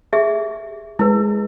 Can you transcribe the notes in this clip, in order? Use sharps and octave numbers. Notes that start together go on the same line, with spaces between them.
G4 G#4 E5
G#3 E4 B4